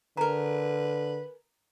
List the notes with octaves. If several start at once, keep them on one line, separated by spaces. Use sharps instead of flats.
D3 G#4 A#4 B4 A#5